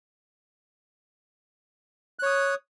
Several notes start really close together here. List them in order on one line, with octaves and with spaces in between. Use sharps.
F#6 C#5 D#6